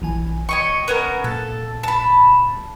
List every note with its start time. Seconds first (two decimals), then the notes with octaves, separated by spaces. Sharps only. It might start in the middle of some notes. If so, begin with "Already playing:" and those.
0.02 A#1 E3 G#5
0.49 C#5 D#5 G5 C#6
0.88 B3 C#4 A#4
1.24 A#2 A4 A6
1.83 A5 B5